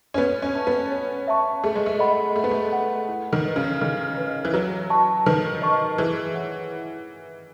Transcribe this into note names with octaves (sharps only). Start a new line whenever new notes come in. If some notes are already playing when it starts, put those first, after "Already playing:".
C#4
B3 C#5
C#4
E5 A5 C#6
B3
C#5
E5 A5 C#6
A3 G#4
G#3
A3
D#5 F#5 B5
A3 G#4
B3
A3
D#5 F#5 B5
E4
D#3
B4 D#5
C#3
D#3 E4
B4 D#5
E3
F#3 B4
D#5 A5 C#6
D#3 B4
D#5 A5 C#6
E3 G#4
C#5 F#5